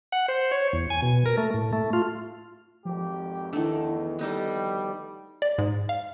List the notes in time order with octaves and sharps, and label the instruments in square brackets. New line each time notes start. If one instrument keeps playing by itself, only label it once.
[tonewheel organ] F#5
C5
C#5
E2
G#5
B2
A#4
A3
A2
A3
F4
[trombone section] G#1 F2 G4 [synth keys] F3
[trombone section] E2 [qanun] D#3 A3 [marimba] D4 E4
[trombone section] D2 G3 [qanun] B3 D#4 A4
[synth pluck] D5
G#2
F5